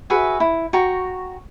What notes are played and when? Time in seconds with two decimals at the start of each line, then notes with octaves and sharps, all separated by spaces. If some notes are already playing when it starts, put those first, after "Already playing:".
0.10 F#4 G#4 B4 E5
0.40 E4
0.73 F#4 G5 A#5 C#6